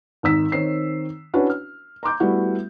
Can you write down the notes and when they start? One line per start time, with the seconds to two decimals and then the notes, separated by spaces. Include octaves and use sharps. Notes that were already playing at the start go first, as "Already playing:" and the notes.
0.23 G#1 D#3 D#4 E6 B6
0.52 D#3 C4 C#5 C7
1.34 C#4 D4 E4 F#4 B4
1.50 F6
2.03 A#5 C6 D6 G6
2.20 G3 A3 B3 E4 F#4